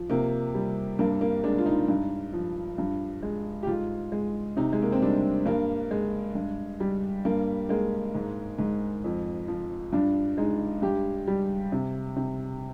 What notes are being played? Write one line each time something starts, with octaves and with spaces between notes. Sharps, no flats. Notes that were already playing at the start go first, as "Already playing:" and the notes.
Already playing: F3
C3 A#3
G3
G2 A#3
A#3
G#3 D4
F4
D#4
G2
F3
G2
G#3
G4
G#2 F4
G#3
C3 D#4
G#3
A#3
C4
G3 D4
G2 A#3
G#3
G2
G3
G2 A#3
G#3 A#3
G#2
G#2
F2
F3
G2 D4
G#3 D#4
G2 G4
G3
C3
C3